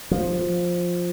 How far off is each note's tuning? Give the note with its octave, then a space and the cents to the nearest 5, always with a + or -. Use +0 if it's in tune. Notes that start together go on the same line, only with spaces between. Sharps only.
F3 +10